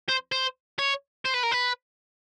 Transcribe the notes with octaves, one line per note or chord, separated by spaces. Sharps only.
C5
C5
C#5
C5
B4
A#4
B4